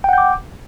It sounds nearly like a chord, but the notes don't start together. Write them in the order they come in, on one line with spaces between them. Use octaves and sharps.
G5 F#5 G6 D6